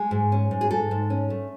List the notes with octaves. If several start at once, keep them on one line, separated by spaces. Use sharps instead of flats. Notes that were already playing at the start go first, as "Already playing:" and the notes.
Already playing: G#3
G#2
C#4
G#2
G#4
G#2 A4
G#2
C#4
A3